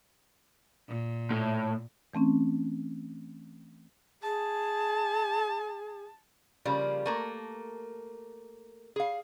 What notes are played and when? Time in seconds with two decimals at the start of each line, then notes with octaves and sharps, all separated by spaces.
0.88 A#2
1.31 A2
2.14 E3 A3 C4 C#4
4.22 G#4 A5
6.65 C#3 F3 G3 A#3
7.06 A3 A#3 A#4
8.96 G#4 F5